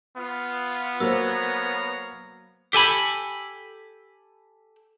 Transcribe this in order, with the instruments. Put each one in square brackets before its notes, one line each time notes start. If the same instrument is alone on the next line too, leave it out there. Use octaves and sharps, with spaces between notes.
[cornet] B3 [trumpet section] F4
[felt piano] F#3 A#3 [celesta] C5 E6 [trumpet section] C#5 F5 A#5
[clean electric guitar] G4 A4 G#5 B5